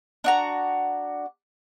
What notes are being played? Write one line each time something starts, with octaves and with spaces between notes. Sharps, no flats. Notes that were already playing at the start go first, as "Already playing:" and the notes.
D4 F#4 A#5